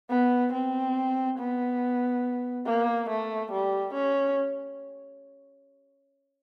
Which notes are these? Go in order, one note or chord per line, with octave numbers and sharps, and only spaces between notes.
B3
C4
B3
A#3
A3
G3
C#4